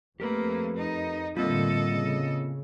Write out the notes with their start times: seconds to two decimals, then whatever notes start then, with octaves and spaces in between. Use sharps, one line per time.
0.20 F2 A3 A#3 G4 A#4 B4
0.76 D#4 D#5
1.37 A2 D3 G3 A#3 C4 F4 A4 D#5
1.90 C#3